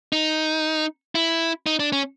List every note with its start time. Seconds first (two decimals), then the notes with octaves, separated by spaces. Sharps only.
0.12 D#4
1.15 E4
1.66 D#4
1.79 D4
1.92 C#4